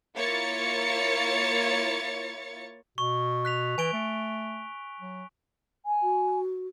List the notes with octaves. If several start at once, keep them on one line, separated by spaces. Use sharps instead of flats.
A#3 E4 F4 C#5 A6 C#7
B2 C#6
F#6 B6 F7
E3 G#5 D7 G7
A3
F#3
G#5
F#4